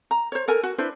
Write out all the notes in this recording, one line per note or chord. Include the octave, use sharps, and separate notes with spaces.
A#5
C5 C#5
A4 A#4 G#5
F#4
D4 E4 B4 C5